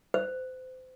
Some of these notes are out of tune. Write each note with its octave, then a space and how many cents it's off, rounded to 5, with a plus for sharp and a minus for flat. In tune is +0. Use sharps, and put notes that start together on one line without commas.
C5 -30